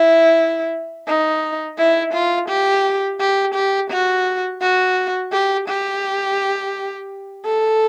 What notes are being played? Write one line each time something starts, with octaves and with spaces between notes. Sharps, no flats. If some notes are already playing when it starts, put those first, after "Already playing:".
Already playing: E4
D#4
E4
F4
G4
G4
G4
F#4
F#4
G4
G4
A4